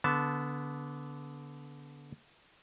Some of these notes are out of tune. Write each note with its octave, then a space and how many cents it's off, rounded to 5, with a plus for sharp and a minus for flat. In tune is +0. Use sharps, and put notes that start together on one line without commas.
D3 -20 B3 +0 A5 -10